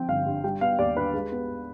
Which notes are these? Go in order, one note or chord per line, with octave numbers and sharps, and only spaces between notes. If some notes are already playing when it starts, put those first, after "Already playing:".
Already playing: F3 C4 G5
G1 F5
G2
G3 G5
B3 F5
D#2 D5
D3 B4
G#3
B3